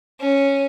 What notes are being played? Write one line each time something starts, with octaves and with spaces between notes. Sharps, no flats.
C#4